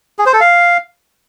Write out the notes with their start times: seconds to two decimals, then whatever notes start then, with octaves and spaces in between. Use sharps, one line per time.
0.19 G#4
0.26 C5
0.33 A4
0.41 F5